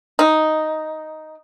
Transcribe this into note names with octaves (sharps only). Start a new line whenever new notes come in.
D#4